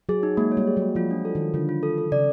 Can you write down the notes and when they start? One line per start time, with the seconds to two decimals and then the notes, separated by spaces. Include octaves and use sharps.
0.09 F#3 G#4
0.23 D#4
0.37 G#3 A#3
0.52 C#5
0.57 G3
0.67 G#4
0.77 F#3
0.82 A#3
0.95 F3 F4
1.11 D4
1.25 A4
1.35 D#3 F4
1.54 D3 F4
1.69 F4
1.83 A4
1.98 A4
2.12 C#3 D5